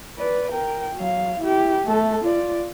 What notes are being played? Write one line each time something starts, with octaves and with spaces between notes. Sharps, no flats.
B4 D5
A#4 G5
F#3 F5
E4 G4
A3 A4
F4 D5